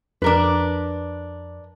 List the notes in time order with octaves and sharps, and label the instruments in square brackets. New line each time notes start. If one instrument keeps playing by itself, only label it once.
[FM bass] F2 [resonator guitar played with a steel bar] D4 A#4 B4